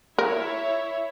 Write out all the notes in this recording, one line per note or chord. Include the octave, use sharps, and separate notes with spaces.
E4 A#4 C#5 E5